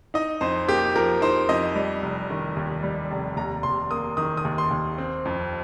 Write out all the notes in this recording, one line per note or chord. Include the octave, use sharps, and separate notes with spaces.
D#4 D#5
F2 C5
A#3 G4
F3 A#4
D#4 C5
F2 D#5
G3
F1
D#3
D#2
G3
F1
D#2 A#5
D#2 C6
A#3 D#6
D#3 D#6
D#6
D#2
C6
D#2
C4
F2